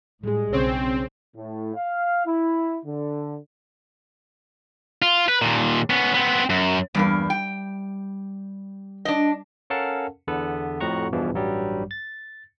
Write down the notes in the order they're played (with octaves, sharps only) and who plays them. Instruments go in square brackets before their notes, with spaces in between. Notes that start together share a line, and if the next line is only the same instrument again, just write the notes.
[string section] A2 G#3 [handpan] G3 G#4
[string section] B1 [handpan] C#3 C#4 C#5 [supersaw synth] C4
[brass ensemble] A2
F5
E4
D3
[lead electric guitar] F4
B4
D#2 A#2
B3 C#4
B3 C4
F#2
[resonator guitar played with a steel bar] E2 G2 A#3 [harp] G3
[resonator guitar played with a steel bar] G5
D4 D#5
[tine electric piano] C#4 A4 A#4 F5 F#5 A5
E2 D3 B3 A4 B4
F2 A2 F#4 F#5 A#5 C#6
E2 G2 B2 E3 F3
A1 G2 F#3 G3
A6